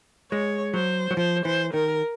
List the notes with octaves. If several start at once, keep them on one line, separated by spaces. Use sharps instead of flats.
G#3 C#5
F#3 C5
F#3
F3 C5
E3 C5
D#3 A#4